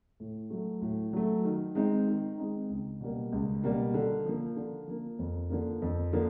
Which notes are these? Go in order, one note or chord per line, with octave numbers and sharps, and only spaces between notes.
A2
F#3 A3
A2
F#3 A3
D#3
G#3 C4 D#4
D#3
G#3 C4 D#4
C#2
B2 G3 A#3
C#2
B2 G3 A#3
D3
F3 A#3
D3
F3 A#3
F2
D3 F3 A#3
F2
D3 F3 A#3